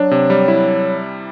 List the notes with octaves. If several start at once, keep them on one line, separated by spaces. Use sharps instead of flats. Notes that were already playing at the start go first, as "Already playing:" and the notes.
Already playing: F#3 D4
C3
G3
E4